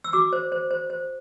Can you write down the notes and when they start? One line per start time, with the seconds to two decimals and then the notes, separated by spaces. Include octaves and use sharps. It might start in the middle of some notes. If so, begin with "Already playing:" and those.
0.04 E6
0.13 F#4 D6
0.33 C5
0.52 C5
0.71 C5
0.90 C5